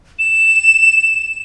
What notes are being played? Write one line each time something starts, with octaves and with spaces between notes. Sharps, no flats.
E7